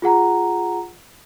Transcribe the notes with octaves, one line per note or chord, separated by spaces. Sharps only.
F4 G#4 F#5 A#5